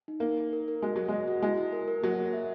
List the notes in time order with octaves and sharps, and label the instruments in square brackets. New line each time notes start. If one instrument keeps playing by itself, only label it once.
[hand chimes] D#4
[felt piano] A#3 [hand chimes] D#4
[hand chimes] D#4
A#4
A#4
[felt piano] G#3 [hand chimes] F#4
[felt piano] F#3 [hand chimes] F#4
[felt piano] G#3 [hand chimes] D#5
[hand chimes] F#4
[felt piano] G#3 [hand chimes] E4
[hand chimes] E4
A#4
A#4
[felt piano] F#3 [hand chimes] A#3
[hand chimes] A#4
E5